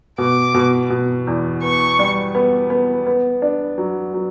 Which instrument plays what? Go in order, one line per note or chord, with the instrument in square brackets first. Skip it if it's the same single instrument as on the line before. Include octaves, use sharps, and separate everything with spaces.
[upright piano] B2 [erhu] D6
[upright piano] B2
B2
E2
[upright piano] B3 [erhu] C#6
[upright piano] G3
B3
B3
B3
D4
F#3
F#3